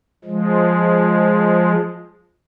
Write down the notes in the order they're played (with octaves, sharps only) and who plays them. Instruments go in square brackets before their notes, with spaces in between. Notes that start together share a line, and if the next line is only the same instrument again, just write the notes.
[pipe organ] F3 G#3